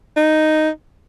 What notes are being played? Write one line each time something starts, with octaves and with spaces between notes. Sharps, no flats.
D#4